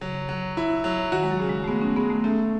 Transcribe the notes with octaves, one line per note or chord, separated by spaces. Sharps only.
C#3 F#3
F#3
E4
F#3
D#3 F#4
G#3
F#3
C#3
G#3
A3
G#3 B3
C#4
G#3 B3
A3
A3 C#4